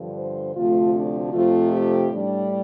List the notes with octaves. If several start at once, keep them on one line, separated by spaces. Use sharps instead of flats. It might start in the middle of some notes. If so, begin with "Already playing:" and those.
Already playing: G2 D3 F3
C5
D2 C3 F3 A3 F4
D4
F2 C3 F3 A3 F4
G4
A2 G3 D4